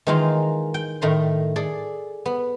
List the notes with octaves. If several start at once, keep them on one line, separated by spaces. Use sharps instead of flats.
D#3 E3 G#3 A#3 D#4 F4
G5
A2 D#3 A3 A#5 C6
G#4 A4 D5
B3